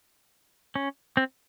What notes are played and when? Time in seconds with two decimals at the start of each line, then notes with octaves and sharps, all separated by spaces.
0.76 C#4
1.17 C4